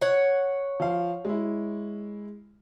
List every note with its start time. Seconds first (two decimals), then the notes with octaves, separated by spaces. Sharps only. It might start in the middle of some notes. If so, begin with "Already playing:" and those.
0.01 C#5 F#5
0.80 F3 F5
1.25 G#3 E4